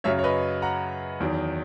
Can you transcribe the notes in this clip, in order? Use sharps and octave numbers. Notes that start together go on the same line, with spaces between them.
F#2 C#3 F#3 C#5 E5
C#5
B4 D#5
F#5 A#5
E2 D#3 F#3